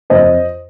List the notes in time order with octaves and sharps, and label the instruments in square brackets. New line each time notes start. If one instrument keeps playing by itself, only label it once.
[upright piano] F2 C5 D#5